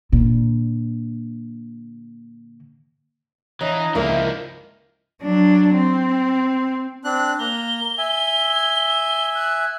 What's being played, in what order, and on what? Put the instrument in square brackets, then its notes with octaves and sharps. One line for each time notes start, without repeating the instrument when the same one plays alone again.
[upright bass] A#2 D3
[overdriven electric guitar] E3 [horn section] D4 D#5 A#5 [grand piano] C#5 [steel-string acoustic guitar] F5
[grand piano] C#2 [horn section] D3 A#3 [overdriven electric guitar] F3 D#4 [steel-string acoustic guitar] E4 A#4
[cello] F#3 D4
C4
[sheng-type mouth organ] C4 D4 F#6
[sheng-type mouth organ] A#3 A#5 [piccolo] G7
[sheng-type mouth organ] E5 G#5
[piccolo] F#6